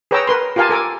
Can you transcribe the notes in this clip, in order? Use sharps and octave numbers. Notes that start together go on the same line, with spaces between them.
G#4 B4 C#5 G5 A#5 E6
A#4 B4 C6
F4 G4 A#4 F5 G#5 A5
A4 A#4 G#5 D6